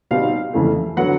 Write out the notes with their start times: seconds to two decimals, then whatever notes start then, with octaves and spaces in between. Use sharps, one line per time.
0.11 B2 G3 C4 D#4 F5
0.54 F2 C#3 E3 A3
0.97 D3 F#3 B3 F#5